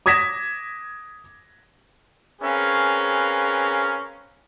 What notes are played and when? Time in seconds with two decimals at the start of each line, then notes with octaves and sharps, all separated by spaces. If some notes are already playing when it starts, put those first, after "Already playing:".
0.06 D6 D#6 G#6 A#6 B6 E7
2.42 C4 C#4 G#4 A#4 B4 F5